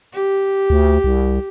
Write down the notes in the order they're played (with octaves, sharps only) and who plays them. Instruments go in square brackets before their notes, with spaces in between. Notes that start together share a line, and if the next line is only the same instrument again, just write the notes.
[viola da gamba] G4
[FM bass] D2
C2